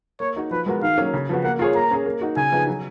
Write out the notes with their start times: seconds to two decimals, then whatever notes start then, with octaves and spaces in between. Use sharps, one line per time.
0.20 A#3 C#5
0.36 D#4 F#4
0.51 F3 B4
0.66 G#3 B3 F#4 A#4
0.82 D#3 F5
0.98 F#3 A#3 C#4
1.13 C#3
1.29 F3 B3 F#4
1.44 A#3 F#5
1.59 F4 G#4 C#5
1.75 A#3 A#5
1.91 C#4 G#4
2.06 A#3
2.21 D#4 F#4
2.37 C#3 G#5
2.52 F3 B3 D#4 G#4
2.67 F#3